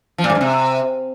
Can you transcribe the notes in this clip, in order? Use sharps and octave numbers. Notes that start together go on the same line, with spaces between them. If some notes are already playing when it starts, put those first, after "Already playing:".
F3
A#2
G#2
G2
C3